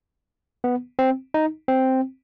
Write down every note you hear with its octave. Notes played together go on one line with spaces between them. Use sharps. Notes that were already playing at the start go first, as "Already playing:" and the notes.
B3
C4
D#4
C4